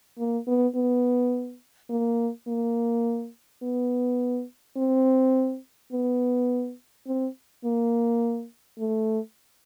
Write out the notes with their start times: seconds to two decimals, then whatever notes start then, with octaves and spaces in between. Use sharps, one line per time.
0.18 A#3
0.47 B3
0.75 B3
1.90 A#3
2.48 A#3
3.63 B3
4.77 C4
5.92 B3
7.07 C4
7.65 A#3
8.79 A3